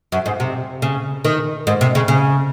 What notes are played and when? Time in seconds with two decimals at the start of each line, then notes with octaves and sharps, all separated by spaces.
0.12 F#2
0.26 G#2
0.40 C3
0.82 C#3
1.25 D#3
1.67 G#2
1.81 C3
1.95 C#3
2.08 C#3